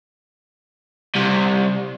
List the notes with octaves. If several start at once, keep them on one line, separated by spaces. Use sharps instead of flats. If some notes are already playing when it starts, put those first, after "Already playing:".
C2 C3